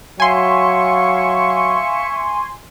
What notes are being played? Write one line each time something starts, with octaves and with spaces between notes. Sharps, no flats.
F#3 E5 F5 G#5 C6 C#6